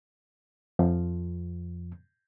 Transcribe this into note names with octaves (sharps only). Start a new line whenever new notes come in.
F2 F3